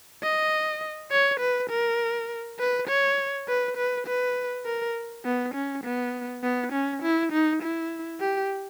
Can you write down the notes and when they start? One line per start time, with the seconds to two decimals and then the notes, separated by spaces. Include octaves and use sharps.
0.23 D#5
1.11 C#5
1.40 B4
1.70 A#4
2.59 B4
2.88 C#5
3.48 B4
3.77 B4
4.07 B4
4.65 A#4
5.25 B3
5.54 C#4
5.84 B3
6.43 B3
6.73 C#4
7.02 E4
7.32 D#4
7.62 E4
8.20 G4